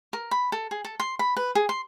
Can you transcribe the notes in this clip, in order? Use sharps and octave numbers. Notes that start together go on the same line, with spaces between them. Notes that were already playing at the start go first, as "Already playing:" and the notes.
A#4
B5
A4
G#4
A4
C6
B5
B4
G#4
C6